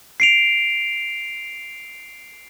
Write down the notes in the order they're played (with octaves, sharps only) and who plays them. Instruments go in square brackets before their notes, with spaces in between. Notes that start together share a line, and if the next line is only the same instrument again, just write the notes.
[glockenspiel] C7 D7 F7